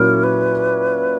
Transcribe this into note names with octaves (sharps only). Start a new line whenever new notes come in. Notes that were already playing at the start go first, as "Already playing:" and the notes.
Already playing: A#2 F#3 C#4 E4 A#4
B4